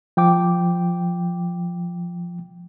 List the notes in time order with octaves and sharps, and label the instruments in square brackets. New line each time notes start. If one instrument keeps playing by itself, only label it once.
[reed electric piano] F3 G5 D6